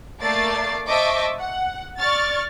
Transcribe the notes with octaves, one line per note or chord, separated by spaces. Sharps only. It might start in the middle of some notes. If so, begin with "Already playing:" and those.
A3 A#3 D5 D6 A6 C7
C5 D#5 E5 A5 C#6 D6
F#5
D5 C#6 F6 A6